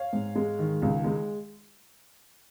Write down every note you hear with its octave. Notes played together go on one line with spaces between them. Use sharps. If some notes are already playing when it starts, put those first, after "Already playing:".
Already playing: C#5 F5
G#2
G#3
D#3
C#2
G#3